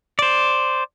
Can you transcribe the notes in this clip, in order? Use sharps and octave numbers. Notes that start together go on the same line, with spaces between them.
C5 D5